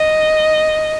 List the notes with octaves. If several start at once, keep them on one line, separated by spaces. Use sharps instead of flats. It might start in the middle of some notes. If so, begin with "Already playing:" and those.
Already playing: D#5